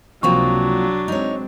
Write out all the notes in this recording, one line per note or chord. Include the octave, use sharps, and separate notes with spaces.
C#2 C3 F3 F#3 A#3 C4 D4 C#6
G#3 C4 D#4 C#5